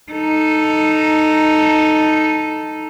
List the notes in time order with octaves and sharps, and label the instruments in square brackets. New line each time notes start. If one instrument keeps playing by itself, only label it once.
[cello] D#4 A4